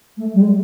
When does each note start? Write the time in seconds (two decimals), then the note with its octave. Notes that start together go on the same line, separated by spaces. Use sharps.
0.17 A3
0.34 G3
0.41 G#3